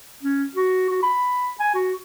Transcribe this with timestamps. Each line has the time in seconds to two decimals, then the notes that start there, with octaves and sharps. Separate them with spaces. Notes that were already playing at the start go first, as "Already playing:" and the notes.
0.23 C#4
0.55 F#4
0.89 F#4
1.03 B5
1.60 G#5
1.74 F#4